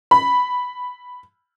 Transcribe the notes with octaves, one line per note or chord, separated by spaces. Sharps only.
B5